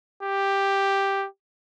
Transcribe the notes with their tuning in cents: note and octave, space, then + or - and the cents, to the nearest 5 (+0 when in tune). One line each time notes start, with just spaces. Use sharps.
G4 +5